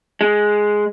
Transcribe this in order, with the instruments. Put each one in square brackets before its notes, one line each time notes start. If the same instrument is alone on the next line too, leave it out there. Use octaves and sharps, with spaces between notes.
[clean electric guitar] G#3